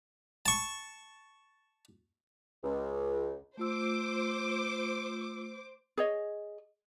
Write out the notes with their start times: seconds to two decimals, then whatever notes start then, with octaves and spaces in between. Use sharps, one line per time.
0.46 A5 C#6
2.64 C#2
3.57 A3 F4 C5 D6 E6
5.98 G#4 C#5 D#5